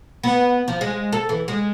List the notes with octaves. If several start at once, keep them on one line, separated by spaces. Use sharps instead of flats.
B3
F3
G#3
A4
E3
G#3